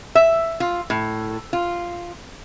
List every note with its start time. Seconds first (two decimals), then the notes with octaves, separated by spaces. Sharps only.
0.15 E5
0.60 F4
0.90 A2
1.53 F4